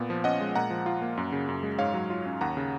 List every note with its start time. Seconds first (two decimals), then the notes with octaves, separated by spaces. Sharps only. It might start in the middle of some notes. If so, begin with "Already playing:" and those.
Already playing: A#2 B3
0.10 F3
0.24 C#4 D#5 F#5
0.41 G#3
0.55 A#2 F#5 A#5
0.70 F3
0.86 F4
1.02 A#3
1.17 F#2
1.32 C#3
1.49 F#2
1.63 G#3
1.79 G#2 C#5 F5
1.94 F#3
2.10 F4
2.26 C#4
2.41 D#2 F#5 A#5
2.57 C#3